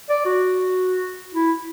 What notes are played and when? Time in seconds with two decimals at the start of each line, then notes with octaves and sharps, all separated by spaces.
0.10 D5
0.25 F#4
1.35 E4